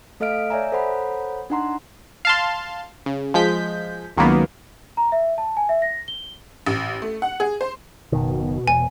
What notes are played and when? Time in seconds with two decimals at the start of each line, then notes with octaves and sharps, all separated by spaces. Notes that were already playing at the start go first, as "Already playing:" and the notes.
0.20 A3 A4 D#5 F5 F6 D7
0.50 C#5 D5 E5 G#5 A#5
0.72 A4 C5 C#5 F#5 A#5 B5
1.50 D4 D#4 F#5 A#5 C6
2.25 F5 A5 C6
3.06 C#3
3.34 F3 G#3 G6 B6
4.17 C#2 D#3 F#3 A#3 B3
4.97 A#5
5.12 E5
5.38 A5
5.57 G#5
5.69 E5
5.82 A#6
6.08 G7
6.66 A1
7.02 A3
7.22 F#5
7.40 G#4
7.61 C5
8.12 F#1 B2 D#3
8.67 E1 G#5